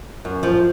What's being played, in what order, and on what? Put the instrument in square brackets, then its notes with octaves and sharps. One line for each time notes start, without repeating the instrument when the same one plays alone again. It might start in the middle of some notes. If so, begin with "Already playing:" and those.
[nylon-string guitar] F#2
F3